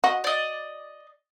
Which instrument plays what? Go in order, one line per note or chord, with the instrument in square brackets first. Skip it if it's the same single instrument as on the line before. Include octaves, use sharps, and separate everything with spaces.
[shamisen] F#4 [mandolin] D#5
[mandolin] D5 D#5